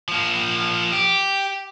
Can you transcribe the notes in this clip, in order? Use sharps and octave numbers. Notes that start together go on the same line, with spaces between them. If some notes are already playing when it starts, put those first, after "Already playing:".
F3 A#3
G4